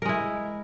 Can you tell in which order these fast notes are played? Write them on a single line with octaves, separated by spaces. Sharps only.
A#4 G#3 E4